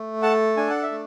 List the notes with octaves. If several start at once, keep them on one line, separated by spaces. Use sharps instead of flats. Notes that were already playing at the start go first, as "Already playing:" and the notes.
Already playing: A3
A4 F#5 A5
D4 G#5
F#5
E5
A3